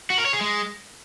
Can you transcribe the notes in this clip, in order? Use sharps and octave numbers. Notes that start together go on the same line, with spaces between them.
F#4
A#4
C#5
G#4
G#3